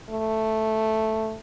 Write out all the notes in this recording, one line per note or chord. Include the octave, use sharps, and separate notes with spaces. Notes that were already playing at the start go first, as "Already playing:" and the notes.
A3